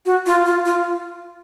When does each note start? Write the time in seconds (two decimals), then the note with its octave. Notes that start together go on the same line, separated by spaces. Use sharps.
0.05 F#4
0.26 F4
0.46 F4
0.65 F4